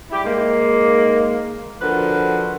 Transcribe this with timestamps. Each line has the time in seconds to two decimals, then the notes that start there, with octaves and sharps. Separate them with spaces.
0.11 G3 E4 G4
0.24 G#2 G#3 A#3
1.81 D3 F3 F#4 A#4 B4